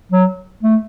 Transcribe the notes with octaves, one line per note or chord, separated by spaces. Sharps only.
F#3
A3